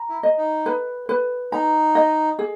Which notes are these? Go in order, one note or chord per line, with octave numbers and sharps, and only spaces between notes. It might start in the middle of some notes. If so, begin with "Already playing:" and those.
Already playing: A#5
E4
D#5
D#4
B4
B4
D#4 A#5
D#5
G#4